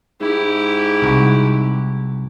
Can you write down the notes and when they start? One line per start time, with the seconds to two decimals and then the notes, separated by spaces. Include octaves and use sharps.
0.21 G#2 E4 G4
1.02 C2 F#4